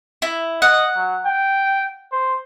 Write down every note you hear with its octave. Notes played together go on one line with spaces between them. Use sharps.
E4
D#5 F#5
F#3
G5
C5